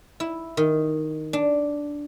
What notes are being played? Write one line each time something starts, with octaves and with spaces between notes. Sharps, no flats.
E4
D#3
D4